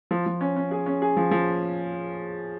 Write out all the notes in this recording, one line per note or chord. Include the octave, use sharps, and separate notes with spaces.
F3
F3
C#4
C#4
G#4
C#4
G#4
F3
F3